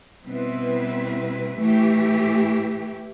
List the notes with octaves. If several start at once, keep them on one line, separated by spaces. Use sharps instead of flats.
B2 G3 C4 E4 B4
A2 E3 A3 E4 G4